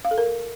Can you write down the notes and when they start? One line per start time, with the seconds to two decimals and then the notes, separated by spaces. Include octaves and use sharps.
0.05 F5
0.11 A4
0.18 A#4